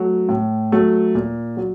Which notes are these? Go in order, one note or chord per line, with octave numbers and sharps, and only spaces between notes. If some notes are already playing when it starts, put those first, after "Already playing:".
Already playing: F#3 A3
A2
F#3 A3
A#2
F#3